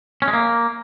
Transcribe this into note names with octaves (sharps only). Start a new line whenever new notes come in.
C#4
G#3
A#3